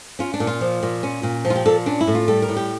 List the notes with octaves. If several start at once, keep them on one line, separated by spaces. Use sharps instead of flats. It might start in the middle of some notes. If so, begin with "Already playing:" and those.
C#4 F4
D4
A#2
F4
F3
A#2
C#4
A#2
F3
F4
G4
A#2 A4
C#4 D4
E4
A2
F4
G3 A4
A#4
A2
G4